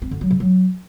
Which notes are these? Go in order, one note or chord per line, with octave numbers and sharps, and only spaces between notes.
C4
D3
F#3
C#3
F#3